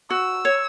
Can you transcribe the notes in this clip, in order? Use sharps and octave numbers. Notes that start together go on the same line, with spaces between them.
F#4 E6
C#5